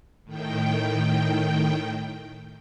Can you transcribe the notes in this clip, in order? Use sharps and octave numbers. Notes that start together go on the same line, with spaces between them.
A2 D#3 G5